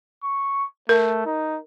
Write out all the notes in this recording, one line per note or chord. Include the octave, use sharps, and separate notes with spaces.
C#6
A3 A#4
D#4